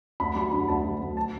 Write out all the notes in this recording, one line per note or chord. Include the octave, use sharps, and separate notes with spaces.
D2 B5
F#3 B5
D3 B5
D2 A5
F#3
D2
A5